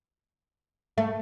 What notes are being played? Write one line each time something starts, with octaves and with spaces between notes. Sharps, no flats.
A3